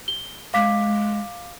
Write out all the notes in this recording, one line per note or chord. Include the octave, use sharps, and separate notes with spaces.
G7
G#3 F5 D6 B6